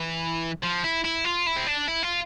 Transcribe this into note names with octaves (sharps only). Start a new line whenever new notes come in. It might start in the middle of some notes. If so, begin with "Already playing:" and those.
Already playing: E3
F3
E4
E4
F4
E4
C4
D4
E4
F4